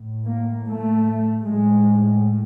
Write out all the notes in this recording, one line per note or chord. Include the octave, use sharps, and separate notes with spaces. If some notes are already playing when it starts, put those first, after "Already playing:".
Already playing: A2
A#3
A3
A2 G#3